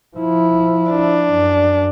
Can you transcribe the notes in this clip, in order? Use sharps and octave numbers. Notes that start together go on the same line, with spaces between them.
F3 E4
D4
F#2